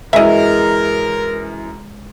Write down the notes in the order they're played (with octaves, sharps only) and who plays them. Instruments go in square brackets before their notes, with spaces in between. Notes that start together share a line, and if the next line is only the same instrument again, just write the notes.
[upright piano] F#2 E3 [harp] G#3 C#6 [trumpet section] A#4 [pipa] D#5 E5